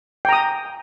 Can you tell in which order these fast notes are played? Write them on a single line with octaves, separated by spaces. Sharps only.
G5 A#5 D#6